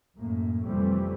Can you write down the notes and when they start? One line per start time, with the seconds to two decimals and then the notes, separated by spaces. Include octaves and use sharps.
0.16 F#2 A2 A#3
0.64 F2 C3 E3 G3 A3 C4